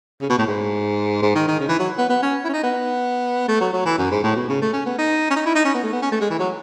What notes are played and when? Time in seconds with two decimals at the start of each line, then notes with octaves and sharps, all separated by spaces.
0.21 C#3
0.29 B2
0.38 A2
0.47 G#2
1.22 G#2
1.35 D#3
1.48 D#3
1.60 C#3
1.69 E3
1.79 F#3
1.98 B3
2.09 B3
2.22 C#4
2.44 E4
2.49 C#4
2.53 D#4
2.63 B3
3.48 A3
3.61 F#3
3.73 F#3
3.85 E3
3.98 F#2
4.11 G#2
4.23 A2
4.36 B2
4.49 C#3
4.61 A3
4.73 C#4
4.86 B3
4.98 D#4
5.30 C#4
5.36 D#4
5.46 E4
5.55 D#4
5.64 C#4
5.74 B3
5.83 A3
5.93 B3
6.02 C#4
6.12 A3
6.21 G#3
6.30 E3
6.39 F#3